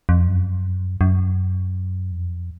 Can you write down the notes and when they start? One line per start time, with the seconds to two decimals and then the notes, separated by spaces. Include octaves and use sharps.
0.09 F2
0.28 F#2
1.01 F#2
2.12 F2